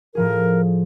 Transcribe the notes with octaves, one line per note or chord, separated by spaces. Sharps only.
A2 F3 G#4 A#4